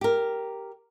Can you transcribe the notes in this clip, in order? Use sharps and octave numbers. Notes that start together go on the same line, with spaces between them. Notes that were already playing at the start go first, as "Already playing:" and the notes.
G4 A#4